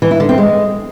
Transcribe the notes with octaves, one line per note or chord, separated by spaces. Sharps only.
E3
E4
D3
C4
G#3